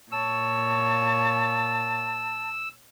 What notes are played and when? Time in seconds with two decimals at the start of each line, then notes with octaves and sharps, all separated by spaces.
0.12 A#2 C#5 A5 E6